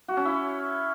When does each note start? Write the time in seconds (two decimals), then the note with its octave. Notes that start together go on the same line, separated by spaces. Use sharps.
0.08 F#4
0.17 C#4
0.25 E4